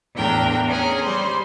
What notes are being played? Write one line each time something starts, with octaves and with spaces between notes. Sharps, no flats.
E2 A2 D4 A#4 G5
C#4 G#4 A#4
G3 C5 C6